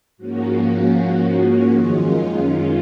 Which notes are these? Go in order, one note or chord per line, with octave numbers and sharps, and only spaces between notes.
G#2 F3 A#3 C#4 F#4
F#4
F#4
F#2 D#3 G#3 C#4 F4